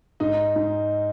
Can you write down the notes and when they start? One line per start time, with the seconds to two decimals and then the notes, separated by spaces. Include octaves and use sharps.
0.20 G#2 D#4
0.56 G#2